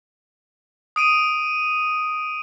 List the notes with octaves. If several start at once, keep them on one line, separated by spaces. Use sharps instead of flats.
D#6 D7 D#7